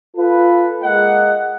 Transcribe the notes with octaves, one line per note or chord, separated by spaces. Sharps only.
F4 A4 B4
G#3 A#3 D#5 F#5